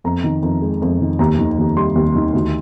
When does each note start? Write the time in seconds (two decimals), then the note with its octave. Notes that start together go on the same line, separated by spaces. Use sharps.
0.04 F2 A#5
0.24 D#3
0.42 F2
0.62 G#3
0.82 F2
1.01 D#3
1.19 D#2 A#5
1.38 D#3
1.58 D#2
1.76 G3 C6
1.95 D#2
2.15 D#3
2.33 D2